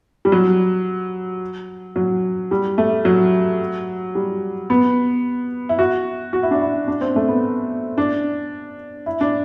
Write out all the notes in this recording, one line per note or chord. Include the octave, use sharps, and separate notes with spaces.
G3
F#3
F#3
G3
A3
F#3
G3
B3
E4
F#4
F#4
E4
D4
E4
D4
C4
A3
B3
D4
E4
D4